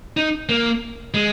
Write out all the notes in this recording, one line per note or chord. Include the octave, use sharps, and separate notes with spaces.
D#4
A#3
G#3